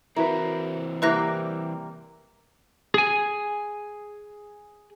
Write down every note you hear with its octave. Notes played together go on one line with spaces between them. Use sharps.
E3 C4 E4 F#4 A#4 B4
C3 G3 A#3 E4 B4 F#5 F#6 A#6
G#4 G#5